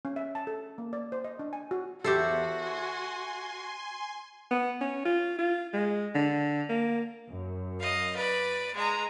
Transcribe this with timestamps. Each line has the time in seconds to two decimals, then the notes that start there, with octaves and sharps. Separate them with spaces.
0.05 C#4
0.16 E5
0.35 A5
0.47 A4
0.78 A#3
0.93 D5
1.12 C5
1.24 D#5
1.39 D4
1.53 G#5
1.71 F#4
2.04 E2 F#4 G4 A4 C5 E5 A5
2.54 G#5 C6
4.51 B3
4.81 C#4
5.05 F4
5.39 F4
5.74 G#3
6.15 D3
6.70 A#3
7.30 F#2
7.80 D#5 F5
8.16 B4 D5
8.75 G#3 A#5